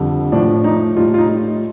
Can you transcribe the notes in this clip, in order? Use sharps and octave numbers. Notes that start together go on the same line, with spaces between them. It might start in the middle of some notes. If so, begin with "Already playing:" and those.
Already playing: F2 D3 G3
A2 F3 D4
D#4
A2 G3 F4
F4
D#4